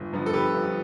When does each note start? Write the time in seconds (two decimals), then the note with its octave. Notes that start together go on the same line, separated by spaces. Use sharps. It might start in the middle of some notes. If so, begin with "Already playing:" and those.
Already playing: G1
0.13 G2 F3 B3
0.26 A4
0.33 G1 G4 B4
0.54 G2 F3 B3